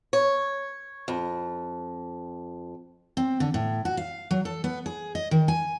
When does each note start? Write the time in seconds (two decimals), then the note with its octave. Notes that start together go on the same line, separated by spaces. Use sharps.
0.13 C#5
1.08 F2
3.17 C4
3.40 D3
3.54 A2
3.85 F#4
3.97 F5
4.31 F#3
4.45 A4
4.64 B3
4.86 G#4
5.15 D#5
5.31 D#3
5.48 G#5